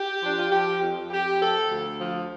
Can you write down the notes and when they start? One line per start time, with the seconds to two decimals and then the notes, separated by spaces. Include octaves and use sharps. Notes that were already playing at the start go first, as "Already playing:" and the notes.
Already playing: G4
0.22 F3 D4
0.38 F4
0.51 F3 G4
0.81 F2
1.10 F2 G4
1.40 F3 A4
1.69 D2
1.98 F3